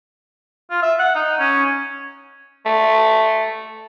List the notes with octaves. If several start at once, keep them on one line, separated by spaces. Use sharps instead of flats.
F4
E5
F#5
D#4
C#4
A3